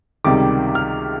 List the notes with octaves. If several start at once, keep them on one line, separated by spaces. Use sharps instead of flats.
C#2 C3 D#3 G3 D6
F6